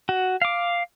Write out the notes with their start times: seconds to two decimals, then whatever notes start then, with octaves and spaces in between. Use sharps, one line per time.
0.09 F#4
0.42 F5 D6